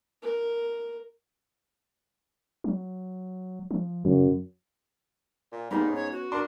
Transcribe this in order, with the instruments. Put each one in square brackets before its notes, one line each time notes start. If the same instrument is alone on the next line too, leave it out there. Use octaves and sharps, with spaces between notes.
[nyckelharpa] A#4
[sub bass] F#3
F3
[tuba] F#2 [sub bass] C#3
[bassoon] A#2
[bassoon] G#2 [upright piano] G3 A#3 B3 [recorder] D#4
[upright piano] B3 C#4
[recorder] C#5
F#4
[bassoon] D4 [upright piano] A#4 C6